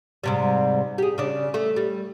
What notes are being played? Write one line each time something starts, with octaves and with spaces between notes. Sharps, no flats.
G#2 C3 G3
G4 G#4
C#3 D4
A3
G3